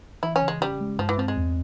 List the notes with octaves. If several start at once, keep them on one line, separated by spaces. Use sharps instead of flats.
E3 E4
C#4
C#3
G#3
G3 C#4
G#3
G2 F3
E3
F3 C4
G#3
E2